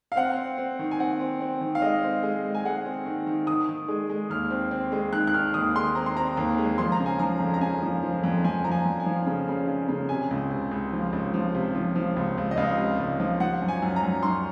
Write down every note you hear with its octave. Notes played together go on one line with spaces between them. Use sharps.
F5
C4 F#5
C4
C4
D#3
G#5
C4 F#5
C4
C4
D#3
F5
G#3 D#5
C4
G#3
G#3
G#5
G#3 F#5
C4
D#3
D#3
D#3 D#6
D#3
G#3
G#3
D#2 F6
C4
C4
G#3
D#3 F#6
F#6
D#3 F6
D#2 D#6
G#3 C6
C4 A#5
C6
C4 A#5
D#2
G#3
F3 C6
A#5
C#3
G#5
F3 A#5
F2
A#5
C#3 G#5
F3
F3
F2
F2 G#5
F3 A#5
G#5
F2
G#5
F3
C#3
C#3
C#3
C#3
C3 G#5
C#2
C3
C#2
F3
C#2
F3
C3
F3
F3
C#2
C#2
D#5
C#2 F5
C3
C#2
F3
F3 F#5
F#2
G#5
F#2
A#5
F#2
F#2 C6